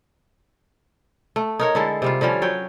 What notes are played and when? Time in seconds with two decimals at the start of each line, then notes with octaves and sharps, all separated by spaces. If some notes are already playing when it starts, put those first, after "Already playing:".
1.36 A3
1.59 D#4 A#4 C#5
1.75 D3 G#3 E4 A4
2.02 C3 G3 F4
2.21 D3 F3 G3 C#4
2.42 F#3 C#5 G5